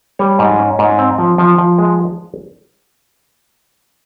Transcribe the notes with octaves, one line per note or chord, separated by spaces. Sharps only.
G3 C#5
G#2
C#4
G#2
C4
F3
F3
F3
G#3